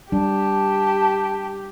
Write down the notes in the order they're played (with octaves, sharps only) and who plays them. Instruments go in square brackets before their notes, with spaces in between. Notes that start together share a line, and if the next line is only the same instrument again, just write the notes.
[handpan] G3 D4 [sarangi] G4 [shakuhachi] A5